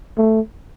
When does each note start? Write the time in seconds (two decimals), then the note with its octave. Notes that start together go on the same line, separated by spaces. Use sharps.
0.18 A3